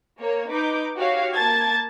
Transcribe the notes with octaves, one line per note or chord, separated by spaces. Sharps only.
A#3 C#5
D#4 B4 D6 G6
F#4 G4 C#5 F5
A#3 A5 G#6 A6